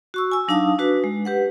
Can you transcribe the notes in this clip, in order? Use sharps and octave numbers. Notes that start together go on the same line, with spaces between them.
F#4 C#6 E6
G#5 E6
F#3 D4 D#4 F5 A5 D#6
D4 F#4 B4
G#3
G4 B4 F#5